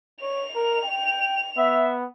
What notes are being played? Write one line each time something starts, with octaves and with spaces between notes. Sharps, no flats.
C#5 F7
A#4
G5
B3 E5